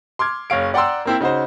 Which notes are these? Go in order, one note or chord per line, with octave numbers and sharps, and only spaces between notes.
C6 D6 F6 G#6
F#1 C#5 F5 D7
D5 F#5 G5 A#5 C6 E6
A#3 C4 E4
C#3 D#4 F#4 C5